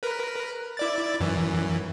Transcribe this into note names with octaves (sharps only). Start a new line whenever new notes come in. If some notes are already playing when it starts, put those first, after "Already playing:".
A#4 B4
E4 D5 A6
F#2 E3